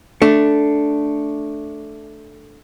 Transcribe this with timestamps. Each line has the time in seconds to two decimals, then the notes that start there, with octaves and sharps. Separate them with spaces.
0.22 A3 D4